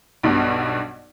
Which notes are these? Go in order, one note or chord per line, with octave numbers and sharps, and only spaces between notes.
B1 G2 B2